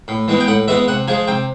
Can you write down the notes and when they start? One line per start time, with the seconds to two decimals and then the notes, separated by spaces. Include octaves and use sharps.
0.08 A2
0.28 E3 G#3 B3
0.40 G5
0.47 A2 F#5
0.68 E3 G#3 B3 E5
0.88 C3 F#5
1.08 F3 G#3 G#5
1.27 C3 G5